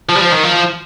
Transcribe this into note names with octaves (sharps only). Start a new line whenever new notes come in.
F3
G3
F3
D#3
F3